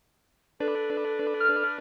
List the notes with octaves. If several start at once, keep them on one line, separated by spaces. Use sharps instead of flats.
D4 A4 B4 D5
F6